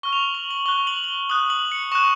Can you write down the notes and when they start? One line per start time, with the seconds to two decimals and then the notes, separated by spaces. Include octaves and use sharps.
0.03 C#6 F6 G7
0.13 F7
0.19 F#7
0.35 F#7
0.51 F#7
0.66 C#6 F#6 G7
0.87 F#7
1.04 F#7
1.08 G7
1.29 D#6 F#6 F#7
1.50 F#7
1.72 C#7
1.92 C#6 F#6 E7